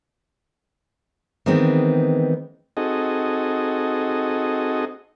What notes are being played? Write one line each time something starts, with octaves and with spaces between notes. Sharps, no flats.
D#3 E3 G#3 B3 C4 D#4
C4 D#4 F#4 G#4 A4 D#5